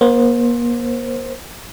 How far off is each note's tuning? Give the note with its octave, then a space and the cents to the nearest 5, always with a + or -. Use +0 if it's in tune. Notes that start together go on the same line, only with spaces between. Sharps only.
A#3 +40 C5 +15